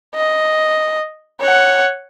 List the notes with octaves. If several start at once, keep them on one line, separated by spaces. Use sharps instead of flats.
D#5
C#5 F#5